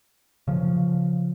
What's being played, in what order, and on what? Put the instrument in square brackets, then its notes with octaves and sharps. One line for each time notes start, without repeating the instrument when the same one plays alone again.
[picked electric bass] C#3 F3